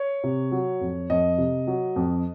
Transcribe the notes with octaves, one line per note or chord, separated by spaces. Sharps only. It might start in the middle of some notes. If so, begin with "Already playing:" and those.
Already playing: C#5
C3
F#3
F2
F2 D#5
C3
F#3
F2